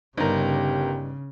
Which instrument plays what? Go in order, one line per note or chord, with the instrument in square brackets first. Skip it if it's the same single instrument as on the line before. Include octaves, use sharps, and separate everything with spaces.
[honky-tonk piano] G1 A#4 [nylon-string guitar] G2 D#4 [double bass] C#3 [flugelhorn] G4